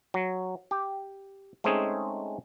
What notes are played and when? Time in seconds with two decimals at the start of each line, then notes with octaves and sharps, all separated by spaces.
0.14 F#3
0.71 G4
1.64 G#3 A3 C4 C#4 D#4 G#4